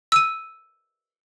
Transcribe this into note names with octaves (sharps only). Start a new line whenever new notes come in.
E6 D#7